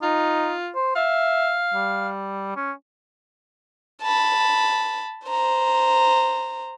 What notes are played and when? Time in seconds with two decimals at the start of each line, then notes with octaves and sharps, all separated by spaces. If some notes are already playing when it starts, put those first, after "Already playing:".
0.02 D#4 F4
0.75 C5
0.96 E5 F5
1.73 G3
2.56 C#4
4.03 A5 B5
5.28 C5 A#5